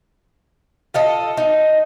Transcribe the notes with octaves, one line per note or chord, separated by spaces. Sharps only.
F4 A4 D#5
D#4